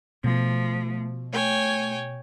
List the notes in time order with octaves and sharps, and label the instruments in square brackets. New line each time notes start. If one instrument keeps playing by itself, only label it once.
[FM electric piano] B2 [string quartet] F3 [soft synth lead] A3
[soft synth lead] A3 [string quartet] C#5 G5 G#5